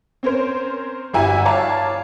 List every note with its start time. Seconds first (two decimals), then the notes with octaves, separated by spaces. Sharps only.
0.23 C4 C#4 A#4 C5
1.13 G1 G3 E4 F#4 G#5
1.45 C#5 D5 F5 A5